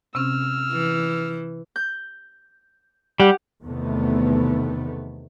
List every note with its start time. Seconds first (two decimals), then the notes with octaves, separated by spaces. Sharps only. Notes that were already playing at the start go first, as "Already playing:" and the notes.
0.15 C3 C4 C#4 E6 F6
0.72 E3
1.76 G6
3.20 G3 G4 F#5
3.64 E2 C3 D#3 A3 B3